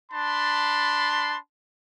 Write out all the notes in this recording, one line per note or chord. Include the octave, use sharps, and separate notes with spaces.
D4 A5 B5 C6